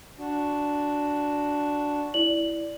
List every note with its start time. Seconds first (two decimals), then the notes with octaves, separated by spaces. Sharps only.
0.19 D4 F#4
2.14 E4 D5 F#7